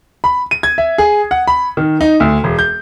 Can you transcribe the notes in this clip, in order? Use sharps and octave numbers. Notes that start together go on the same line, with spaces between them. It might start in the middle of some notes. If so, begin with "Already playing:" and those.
B5
D#7
G#6
E5
G#4
F#5
B5
D#3
D#4
D2
E1
G6